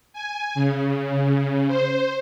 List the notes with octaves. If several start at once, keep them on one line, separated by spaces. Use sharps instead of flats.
G#5
C#3
C5